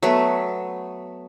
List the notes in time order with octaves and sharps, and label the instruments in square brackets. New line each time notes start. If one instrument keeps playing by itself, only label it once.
[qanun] F#3 A3 B3 B4